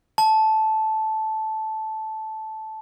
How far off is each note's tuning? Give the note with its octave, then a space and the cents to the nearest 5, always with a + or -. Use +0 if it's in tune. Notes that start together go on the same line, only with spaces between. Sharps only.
A5 -10